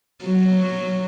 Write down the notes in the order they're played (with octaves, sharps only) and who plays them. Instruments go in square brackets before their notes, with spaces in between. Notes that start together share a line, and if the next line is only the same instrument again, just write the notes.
[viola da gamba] F#3